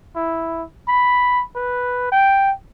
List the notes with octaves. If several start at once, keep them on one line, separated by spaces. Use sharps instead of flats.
E4
B5
B4
G5